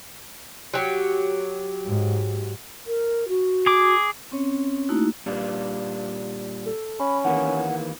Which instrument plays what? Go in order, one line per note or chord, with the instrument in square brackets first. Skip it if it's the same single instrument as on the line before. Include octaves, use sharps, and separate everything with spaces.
[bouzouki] F#3 G4
[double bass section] G#2
[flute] A#4
F#4
[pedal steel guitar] G#4 D6
[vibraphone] C4 C#4 C#5
A3 A#3 D#4 E4 F#4
[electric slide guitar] A#2 G3 D4
[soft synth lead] A4
[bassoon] C#4 [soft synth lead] B5
[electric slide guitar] D#3 E3 A#3 [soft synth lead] F#5